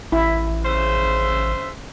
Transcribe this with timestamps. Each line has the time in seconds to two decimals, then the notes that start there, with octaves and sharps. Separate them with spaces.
0.12 A1 E4
0.65 C#3 C5 E5